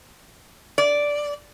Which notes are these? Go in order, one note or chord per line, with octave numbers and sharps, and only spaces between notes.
D5